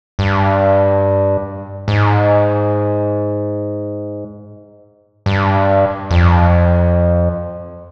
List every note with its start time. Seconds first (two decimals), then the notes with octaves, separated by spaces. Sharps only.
0.19 G2
1.88 G#2
5.26 G2
6.11 F2